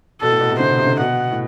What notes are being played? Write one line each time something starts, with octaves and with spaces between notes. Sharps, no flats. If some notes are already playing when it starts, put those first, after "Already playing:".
B2 A4
A2
B2
C3
D3 C5
C3
D3
B2 F#5
A2